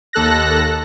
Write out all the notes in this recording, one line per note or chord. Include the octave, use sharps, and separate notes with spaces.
D#2 A4 F#6 A#6